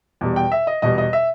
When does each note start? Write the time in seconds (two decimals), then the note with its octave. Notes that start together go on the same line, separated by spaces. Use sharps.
0.21 E2 B2 G3
0.36 G5
0.52 E5
0.67 D#5
0.82 E2 B2 G3 D#5
0.98 D#5
1.13 E5